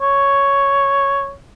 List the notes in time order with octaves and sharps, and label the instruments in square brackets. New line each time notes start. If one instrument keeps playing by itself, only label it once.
[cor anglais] C#5